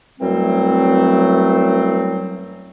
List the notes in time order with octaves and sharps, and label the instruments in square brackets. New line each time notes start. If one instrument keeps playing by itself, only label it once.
[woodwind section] F#2 E3 F#3 G3 A3 C4